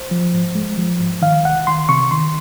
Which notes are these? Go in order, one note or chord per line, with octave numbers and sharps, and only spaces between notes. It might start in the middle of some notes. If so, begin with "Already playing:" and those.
Already playing: C5
F3
G#2
G#3
F3
G#2
D#3 F5
C2 F#5
D#3 C6
C3 C#6
D#3 C6